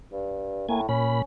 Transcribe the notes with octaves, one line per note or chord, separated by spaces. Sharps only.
G2
A2 A#3 G#5
A#2 C#4 B5